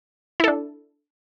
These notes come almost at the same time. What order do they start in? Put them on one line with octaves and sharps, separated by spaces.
E4 A4 D4